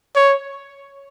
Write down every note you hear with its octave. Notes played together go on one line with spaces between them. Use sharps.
C#5